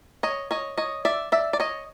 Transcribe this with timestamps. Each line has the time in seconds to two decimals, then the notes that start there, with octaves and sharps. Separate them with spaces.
0.23 C#5 D#5
0.51 C#5 D#5
0.78 C#5 D#5
1.05 D5 E5
1.32 D5 E5
1.53 D5
1.60 C#5 D#5